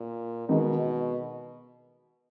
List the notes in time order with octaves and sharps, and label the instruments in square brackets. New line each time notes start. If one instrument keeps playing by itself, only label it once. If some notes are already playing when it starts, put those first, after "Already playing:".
Already playing: [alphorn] A#2
[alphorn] B2 [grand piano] D#3 G#3 D#4